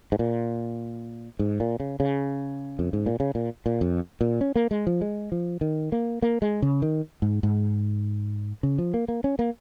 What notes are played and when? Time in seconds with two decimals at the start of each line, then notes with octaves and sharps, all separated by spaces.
0.12 G#2
0.19 A#2
1.39 G#2
1.60 A#2
1.80 C#3
2.00 C#3
2.79 F2
2.93 G#2
3.06 A#2
3.20 C#3
3.35 A#2
3.66 A#2
3.81 F2
4.21 A#2
4.41 C#4
4.56 A#3
4.71 G#3
4.87 F3
5.01 G#3
5.32 F3
5.61 D#3
5.92 A#3
6.22 A#3
6.42 G#3
6.62 C#3
6.82 D#3
7.22 G#2
7.43 G#2
8.63 C#3
8.78 F3
8.94 A#3
9.08 A#3
9.24 C#4
9.39 A#3